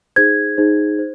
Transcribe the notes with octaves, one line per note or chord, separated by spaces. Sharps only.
D#4 G#4 C5 G#6
D#4 G#4 C5
C5